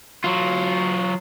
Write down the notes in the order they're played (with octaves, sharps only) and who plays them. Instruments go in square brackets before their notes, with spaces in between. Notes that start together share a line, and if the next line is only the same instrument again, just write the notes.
[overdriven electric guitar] F#3 F4